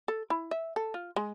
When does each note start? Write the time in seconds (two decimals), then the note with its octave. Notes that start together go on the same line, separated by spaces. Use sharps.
0.08 A4
0.30 E4
0.51 E5
0.76 A4
0.94 F4
1.16 G#3